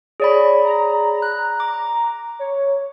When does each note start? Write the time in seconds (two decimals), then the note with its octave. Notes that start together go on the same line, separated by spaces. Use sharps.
0.20 G#4 C#5 D5 B5
0.64 A#5
1.22 F#6
1.60 D6
2.39 C#5